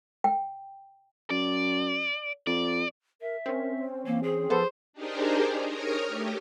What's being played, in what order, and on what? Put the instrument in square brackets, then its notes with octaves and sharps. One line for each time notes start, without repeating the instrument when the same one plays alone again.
[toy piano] G5
[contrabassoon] F#2 [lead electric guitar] D5
[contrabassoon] F2 [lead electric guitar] D5
[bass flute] A#4 [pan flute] E5
[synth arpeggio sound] C4 C#4 [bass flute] A#4
[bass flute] C5
[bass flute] E3 [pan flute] A#3
[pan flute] G#4
[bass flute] F3 [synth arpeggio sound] B3 A4 [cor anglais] C5
[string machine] D4 D#4 G4 G#4 A#4 C5
A#4 C#5 A#5 D#6 F6
A3 G4